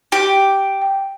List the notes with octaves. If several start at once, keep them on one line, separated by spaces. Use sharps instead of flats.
G4